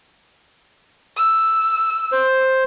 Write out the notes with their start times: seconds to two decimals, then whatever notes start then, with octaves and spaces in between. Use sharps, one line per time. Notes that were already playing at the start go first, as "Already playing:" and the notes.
1.17 E6
2.12 C5